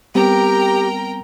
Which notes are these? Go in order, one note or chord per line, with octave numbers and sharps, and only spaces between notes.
G3 B3 C4 G4 A#4 G5 A#5